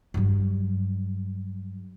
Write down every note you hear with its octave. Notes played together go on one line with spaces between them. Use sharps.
G2 F#3